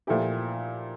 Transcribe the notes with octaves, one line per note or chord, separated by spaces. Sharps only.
A#2 F3 A3 E4 G4